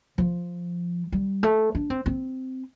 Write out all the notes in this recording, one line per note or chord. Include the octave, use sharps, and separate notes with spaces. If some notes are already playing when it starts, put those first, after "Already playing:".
F3
G3
A3
D4
C4
C4